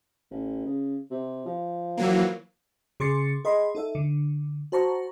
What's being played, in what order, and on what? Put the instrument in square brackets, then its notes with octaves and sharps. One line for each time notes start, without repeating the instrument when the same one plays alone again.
[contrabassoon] A1
C#3
C3
F3
[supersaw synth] E3 F#3 A#3
[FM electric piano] C#3 G#4 C6 D6 A6 C#7
G#4 D#5 B5 C6
D#4 A4 E5
D3
F#4 C5 A5 A#5 C#6